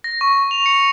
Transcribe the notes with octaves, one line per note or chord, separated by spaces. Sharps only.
A#6
C#6
F7
C#7